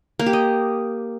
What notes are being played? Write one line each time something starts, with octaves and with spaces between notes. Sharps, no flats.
A#3
G4
D#5